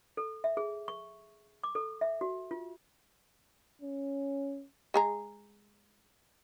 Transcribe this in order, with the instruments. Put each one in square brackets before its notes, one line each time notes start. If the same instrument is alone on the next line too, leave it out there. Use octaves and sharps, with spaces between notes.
[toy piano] A4
E5
G#4
C#6
D6
A4
E5
F#4
F4
[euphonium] C#4
[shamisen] G#3 G#4 A#5